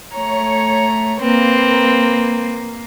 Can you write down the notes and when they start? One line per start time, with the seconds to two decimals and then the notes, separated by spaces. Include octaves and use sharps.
0.14 A3 C#5 A#5
1.20 A#3 C4 B4